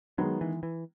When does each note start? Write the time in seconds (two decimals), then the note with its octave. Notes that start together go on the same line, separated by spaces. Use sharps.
0.18 D#3 F#3 G#3 B3
0.41 E3
0.63 E3